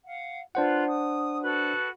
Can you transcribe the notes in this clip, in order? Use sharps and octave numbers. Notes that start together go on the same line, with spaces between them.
F5 F#5
D4 F4 B4 C5 F#5
D#6
F#4 A4 B4